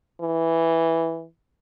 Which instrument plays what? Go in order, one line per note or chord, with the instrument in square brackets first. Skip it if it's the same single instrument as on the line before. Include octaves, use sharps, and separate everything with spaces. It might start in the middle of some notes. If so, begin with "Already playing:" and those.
[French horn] E3